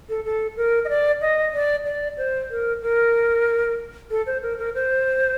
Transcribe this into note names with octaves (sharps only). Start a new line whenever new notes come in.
A4
A4
A#4
D#5
D5
D#5
D5
D5
C5
A#4
A#4
A4
C5
A#4
A#4
C5